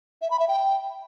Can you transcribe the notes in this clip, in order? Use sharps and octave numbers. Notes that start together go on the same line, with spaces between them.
E5
B5
E5
G5